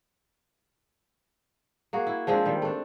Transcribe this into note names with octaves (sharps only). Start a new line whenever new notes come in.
A#3 F#4 G#4
E4
F3 G#3 C4 D4
D#3 G3
A3 D4